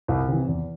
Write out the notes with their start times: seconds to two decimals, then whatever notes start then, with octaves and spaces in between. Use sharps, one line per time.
0.08 C2
0.28 C3 E3
0.47 E2